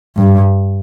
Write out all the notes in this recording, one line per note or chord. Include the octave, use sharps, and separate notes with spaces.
G2